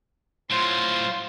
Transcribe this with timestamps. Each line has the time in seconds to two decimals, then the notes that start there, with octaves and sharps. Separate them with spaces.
0.51 A2 F#3 F4 C5 C6